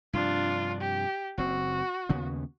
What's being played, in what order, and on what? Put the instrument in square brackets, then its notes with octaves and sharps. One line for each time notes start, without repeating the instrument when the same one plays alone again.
[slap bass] G2 C3 F3 [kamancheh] D4 F4
[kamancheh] G4
[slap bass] F#1 C4 [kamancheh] F#4
[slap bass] D#2 C#3 B3